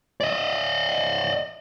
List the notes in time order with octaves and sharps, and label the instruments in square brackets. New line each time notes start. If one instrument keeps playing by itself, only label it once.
[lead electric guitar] D5 D#5